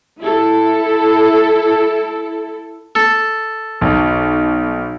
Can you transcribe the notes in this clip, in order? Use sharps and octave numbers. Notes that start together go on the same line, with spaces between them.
E4 A4
A4
B1